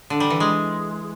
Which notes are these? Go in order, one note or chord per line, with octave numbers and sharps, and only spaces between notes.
D3
G3
E3
G#3